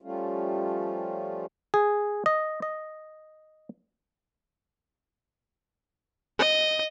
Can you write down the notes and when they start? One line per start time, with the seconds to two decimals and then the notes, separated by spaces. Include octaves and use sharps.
0.02 F3 G3 A3 C#4 F4
1.74 G#4
2.26 D#5
2.62 D#5
6.39 D#5